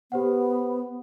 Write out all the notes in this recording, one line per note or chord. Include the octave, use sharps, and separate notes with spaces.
B3 G4 C5 F#5